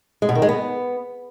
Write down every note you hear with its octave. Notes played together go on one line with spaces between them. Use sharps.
G#3
B2
D#3
G#3
B3